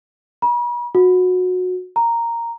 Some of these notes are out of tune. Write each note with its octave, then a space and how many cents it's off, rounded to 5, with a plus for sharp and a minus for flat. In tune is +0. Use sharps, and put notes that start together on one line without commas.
B5 -45
F#4 -20
A#5 -5